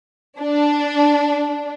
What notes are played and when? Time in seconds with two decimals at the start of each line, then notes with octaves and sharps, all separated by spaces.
0.39 D4